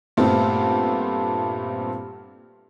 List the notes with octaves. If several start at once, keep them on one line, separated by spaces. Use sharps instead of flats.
G2 A#2 A3 B3 C4 A4